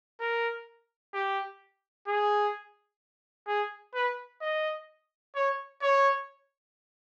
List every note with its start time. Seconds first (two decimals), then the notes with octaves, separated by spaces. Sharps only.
0.20 A#4
1.14 G4
2.08 G#4
3.48 G#4
3.94 B4
4.41 D#5
5.35 C#5
5.82 C#5